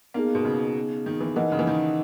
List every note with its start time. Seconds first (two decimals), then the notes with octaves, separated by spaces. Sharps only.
0.14 A#3 B3 D#4 G#4
0.35 B2
0.45 C#3
1.06 D#3
1.21 E3
1.36 E3 D#4 A#4 D#5 F#5
1.52 C#3
1.59 E3
1.67 D#3